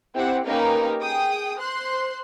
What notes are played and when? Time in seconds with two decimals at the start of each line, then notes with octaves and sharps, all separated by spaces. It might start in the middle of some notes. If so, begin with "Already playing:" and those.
0.15 C4 E4 G4 C5 F#5
0.44 A#3 C#4 D#4 G4 A#4 B4
1.02 G#4 G5 D#6
1.58 C5 C6 F#6